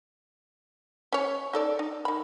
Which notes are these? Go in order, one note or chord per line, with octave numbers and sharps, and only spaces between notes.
C#4 C#5
D#4 A4 D5
D#4
D#3 B5